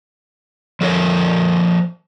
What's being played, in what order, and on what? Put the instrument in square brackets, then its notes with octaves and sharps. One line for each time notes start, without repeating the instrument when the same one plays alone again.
[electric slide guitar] F3 A4 A#4 C#5